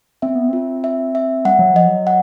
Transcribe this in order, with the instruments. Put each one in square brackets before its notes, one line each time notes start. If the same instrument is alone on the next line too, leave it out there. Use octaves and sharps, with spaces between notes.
[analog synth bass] C4 [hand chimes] E5
[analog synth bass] B3
[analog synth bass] C4 [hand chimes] F4
[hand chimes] E5
E5
[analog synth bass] G3 [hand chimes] F#5
[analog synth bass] F#3
[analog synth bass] F3 [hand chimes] D#5
[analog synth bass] F#3
[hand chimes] F#5